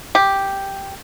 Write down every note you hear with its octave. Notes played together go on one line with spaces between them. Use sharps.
G4